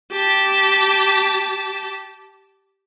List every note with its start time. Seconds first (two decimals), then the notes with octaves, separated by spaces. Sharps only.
0.12 G4 A5